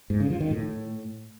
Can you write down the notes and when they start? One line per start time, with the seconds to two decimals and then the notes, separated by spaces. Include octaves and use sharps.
0.10 G#2
0.20 C#3
0.30 F3
0.41 D#3
0.51 A2